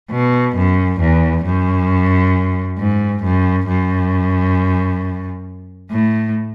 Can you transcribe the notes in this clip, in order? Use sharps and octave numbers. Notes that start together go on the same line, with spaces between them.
B2
F#2
E2
F#2
G#2
F#2
F#2
A2